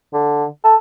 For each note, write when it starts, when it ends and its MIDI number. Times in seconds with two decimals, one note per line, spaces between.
0.14 0.46 50
0.64 0.76 69